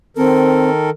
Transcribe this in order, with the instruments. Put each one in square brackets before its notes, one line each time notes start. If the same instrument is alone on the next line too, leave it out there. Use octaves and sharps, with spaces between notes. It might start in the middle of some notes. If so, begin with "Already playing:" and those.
[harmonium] D#3 A4 A#4 [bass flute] C4